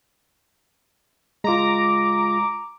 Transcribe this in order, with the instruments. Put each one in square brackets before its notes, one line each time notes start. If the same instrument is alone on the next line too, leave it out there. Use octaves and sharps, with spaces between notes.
[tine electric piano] G#3 F4 [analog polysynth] A#5 D6